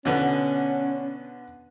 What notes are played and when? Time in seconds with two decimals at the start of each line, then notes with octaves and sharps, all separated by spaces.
0.05 B2 D3 B3 C#4